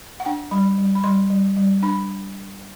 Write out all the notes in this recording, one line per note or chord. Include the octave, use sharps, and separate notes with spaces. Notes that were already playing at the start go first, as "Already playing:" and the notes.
F#5
D4 G5
G3 B5
G3
B5
G3 C6
G3
G3
D4 B5